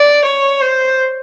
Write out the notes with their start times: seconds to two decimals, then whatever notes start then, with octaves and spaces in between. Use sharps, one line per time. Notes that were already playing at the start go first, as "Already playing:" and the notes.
Already playing: D5
0.26 C#5
0.61 C5